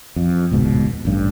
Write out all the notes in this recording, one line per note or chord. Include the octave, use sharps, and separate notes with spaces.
F2
D#1 C#2 G#2 B2
A1 G2